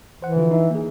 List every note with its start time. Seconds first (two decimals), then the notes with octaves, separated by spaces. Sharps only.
0.22 E3 C5 F#5
0.36 D3 F3 F4
0.51 D#4 E4 E5
0.70 A#3 G#4